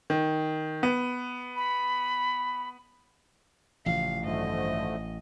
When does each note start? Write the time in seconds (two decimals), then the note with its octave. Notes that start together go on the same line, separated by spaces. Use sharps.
0.10 D#3
0.83 B3
1.56 B5
3.86 A1 C#3 E3 F3 F5
4.24 G2 D3 D#3 F3 F#3 A3 D#5